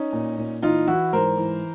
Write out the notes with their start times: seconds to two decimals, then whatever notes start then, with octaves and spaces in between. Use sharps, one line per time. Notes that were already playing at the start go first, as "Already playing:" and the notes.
Already playing: C#4 D#4
0.13 A#2
0.38 A#2
0.62 E3 D#4 F4
0.87 E3 E4 F#4
1.13 G#2 A#4 C5
1.38 E3